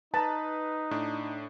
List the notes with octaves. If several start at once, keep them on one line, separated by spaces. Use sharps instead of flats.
D#4 B4 A5 A#5
A2 D4